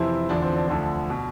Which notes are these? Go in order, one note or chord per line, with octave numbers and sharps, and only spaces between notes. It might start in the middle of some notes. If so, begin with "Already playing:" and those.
Already playing: F2 C3 E3 C4 E4
E2 D3 F3 D4
C4
D4
D2 D3 F3
B2